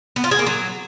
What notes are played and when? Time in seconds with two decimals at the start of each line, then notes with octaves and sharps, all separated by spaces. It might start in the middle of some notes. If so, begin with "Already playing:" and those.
0.16 B3
0.24 F4
0.31 G#4
0.39 A#3
0.47 F#3